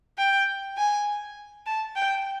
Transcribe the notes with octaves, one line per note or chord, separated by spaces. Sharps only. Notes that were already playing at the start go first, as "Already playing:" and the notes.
G5
G#5
A5
G5